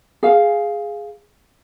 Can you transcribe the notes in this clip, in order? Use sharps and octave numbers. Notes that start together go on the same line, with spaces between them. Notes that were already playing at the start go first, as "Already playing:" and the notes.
G#4 F5